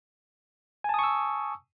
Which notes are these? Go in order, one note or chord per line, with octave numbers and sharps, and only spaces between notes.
G#5 A5 C#6 D#6 E6